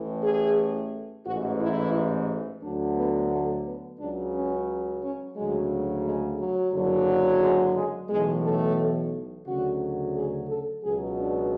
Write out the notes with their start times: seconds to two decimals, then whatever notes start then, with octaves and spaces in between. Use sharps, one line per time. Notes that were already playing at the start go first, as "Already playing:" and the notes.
Already playing: A1 A2 E3
0.24 G#4
1.26 A1 G#2 E3 F#4
1.61 E4
2.63 D2 D3 F#3 D4
2.97 B3
3.31 A3
3.65 B3
4.00 C#2 C#3 F#3 D4
4.34 C#4
5.03 C#4
5.36 D2 C#3 F#3 G#3
6.04 G#3
6.39 F#3
6.73 F#1 F#2 D3 F#3
7.41 G#3
7.76 G#3
8.10 B1 A2 E3 G#3
8.44 A3
9.46 D2 C#3 F#3 F#4
10.15 G#4
10.49 A4
10.83 C#2 B2 F#3 G#4
11.18 D4